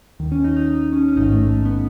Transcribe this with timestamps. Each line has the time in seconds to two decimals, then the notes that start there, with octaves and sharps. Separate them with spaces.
0.19 D#2 D#3
0.32 C#4
0.44 D#4
0.56 D#4
0.92 C#4
1.08 C#4
1.16 A1 G#2 D#3 D#4
1.32 A3
1.49 A3
1.65 B3